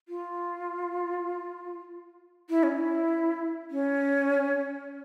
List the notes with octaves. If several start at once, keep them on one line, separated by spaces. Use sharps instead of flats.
F4
E4
C#4
E4
C#4